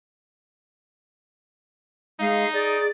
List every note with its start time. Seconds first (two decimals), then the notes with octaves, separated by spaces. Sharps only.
2.20 G#3 D#4 F5
2.53 G#4 D5